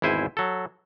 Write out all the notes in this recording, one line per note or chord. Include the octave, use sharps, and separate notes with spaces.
G#1 E2 E4 C5 G#5
F#3 A4